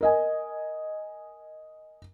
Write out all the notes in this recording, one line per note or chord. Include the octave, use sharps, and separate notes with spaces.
A#4 D#5 G#5